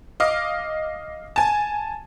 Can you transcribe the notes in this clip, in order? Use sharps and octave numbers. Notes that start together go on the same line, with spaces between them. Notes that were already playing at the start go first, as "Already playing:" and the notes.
D#5 F5 D6
G#5 A5